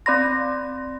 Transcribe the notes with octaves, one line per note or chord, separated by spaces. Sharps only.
C4 D5 B5 C6 A#6